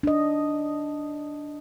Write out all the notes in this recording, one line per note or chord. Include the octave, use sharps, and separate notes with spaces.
D4 D#5